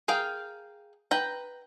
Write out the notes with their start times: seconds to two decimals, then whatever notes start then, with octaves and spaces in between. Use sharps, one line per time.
0.08 G#4 A#4 F5 G5
1.11 B4 G5 A#5